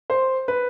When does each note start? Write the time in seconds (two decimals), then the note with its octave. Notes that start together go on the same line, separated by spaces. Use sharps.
0.10 C5
0.48 B4